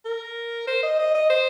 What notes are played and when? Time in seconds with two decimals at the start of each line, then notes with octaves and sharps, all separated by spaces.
0.05 A#4
0.67 C5
0.83 D#5
0.99 D#5
1.15 D#5
1.30 C5